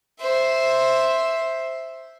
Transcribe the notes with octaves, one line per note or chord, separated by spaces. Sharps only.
C5 E5